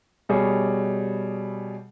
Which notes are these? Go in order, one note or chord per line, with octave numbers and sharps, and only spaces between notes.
B2 G3 G#4 C#5